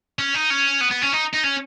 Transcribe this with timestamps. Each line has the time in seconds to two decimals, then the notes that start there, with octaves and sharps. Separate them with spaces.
0.19 C#4
0.34 D#4
0.50 C#4
0.81 B3
0.91 B3
1.02 C#4
1.13 D#4
1.34 D#4
1.44 C#4